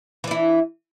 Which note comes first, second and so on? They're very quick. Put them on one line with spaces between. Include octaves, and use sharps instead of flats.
E3 D4 E4